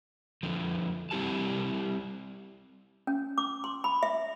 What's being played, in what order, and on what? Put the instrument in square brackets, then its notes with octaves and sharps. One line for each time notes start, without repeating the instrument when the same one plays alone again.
[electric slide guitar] F2 B2 D3 F3
G3 C4 E4 G4 A5
[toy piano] C#4
D6
C6
B5
E5